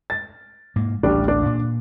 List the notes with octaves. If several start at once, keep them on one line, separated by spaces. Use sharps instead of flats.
A6
G#2 A#3
A1 D2 G3 D4
D4
A#2